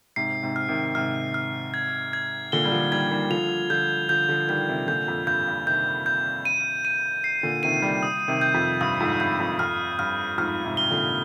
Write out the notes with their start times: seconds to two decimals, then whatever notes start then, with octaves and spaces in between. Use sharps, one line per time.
0.16 G#2 C3 C7
0.43 G#2 C3
0.56 F6
0.68 C3 D#3
0.95 G#2 C3 F6
1.34 F6
1.74 G#6
2.13 G#6
2.52 A#2 D3 G7
2.65 G3
2.71 D3 F3
2.91 D#3 G3 G#6
3.11 D#3 G3
3.30 D3 F3 F7
3.70 D3 F3 G6
4.09 D3 F3 G6
4.29 D3 F3
4.48 D#3 G3 G6
4.68 C3 D#3
4.87 A#2 D3 G6
5.08 F2
5.27 G2 G6
5.48 G2
5.66 C3 D#3 G6
6.06 G6
6.45 D#7
6.85 D#7
7.24 C7
7.43 A#2 D3
7.63 C3 D#3 D#7
7.82 D#3 G3
8.03 D#6
8.28 C3 D#3
8.41 G6
8.54 F2
8.81 G2 D#6
9.00 F2 G#2
9.20 G2 G6
9.40 F2
9.59 F2 F6
9.99 G2 F6
10.38 F2 G#2 F6
10.64 G#2 C3
10.77 G7
10.90 A#2 D3